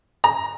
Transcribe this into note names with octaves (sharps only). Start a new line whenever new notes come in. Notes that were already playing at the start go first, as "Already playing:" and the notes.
A#5